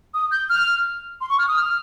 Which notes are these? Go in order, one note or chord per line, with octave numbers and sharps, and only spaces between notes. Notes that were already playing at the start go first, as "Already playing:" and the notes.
D#6
G6
F6
C6
C#6
F6
D#6
F6